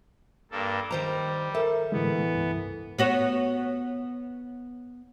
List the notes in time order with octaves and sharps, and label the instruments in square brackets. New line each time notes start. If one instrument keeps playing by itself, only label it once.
[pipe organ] G2 A#3 A4
[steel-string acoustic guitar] D#3 C5 A#5 [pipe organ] G3
[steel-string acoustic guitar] A4 [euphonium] A#4 [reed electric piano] E5
[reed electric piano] A2 D3 G#3 [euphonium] E3 [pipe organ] B3
[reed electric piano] C2 G2
[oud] B3 F#4 C#5